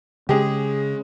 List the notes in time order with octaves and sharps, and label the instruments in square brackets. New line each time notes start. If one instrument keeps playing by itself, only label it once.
[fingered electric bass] C#3 C#4 [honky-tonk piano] G#3 [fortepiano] G4 G#4